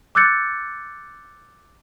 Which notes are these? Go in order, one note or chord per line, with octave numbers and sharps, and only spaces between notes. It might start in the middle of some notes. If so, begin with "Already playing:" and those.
D6 E6 F#6 G6 A6 C#7